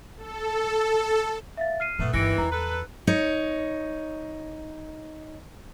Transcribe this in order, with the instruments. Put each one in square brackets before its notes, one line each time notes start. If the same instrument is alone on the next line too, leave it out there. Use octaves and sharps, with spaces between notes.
[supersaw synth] A4
[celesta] E5 F5 A6
F6 C7 D#7
[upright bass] F#1 A#2 [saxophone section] A3 B3
[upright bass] G1 [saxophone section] G2 D#3 E3 [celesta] A#6 C#7 D7
[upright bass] E2 [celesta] A#5
[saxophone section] A4 B4
[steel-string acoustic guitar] D#4 C#5